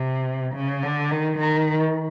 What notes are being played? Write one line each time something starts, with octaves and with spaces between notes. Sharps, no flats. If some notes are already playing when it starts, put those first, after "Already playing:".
Already playing: C3
C#3
D3
D#3
D#3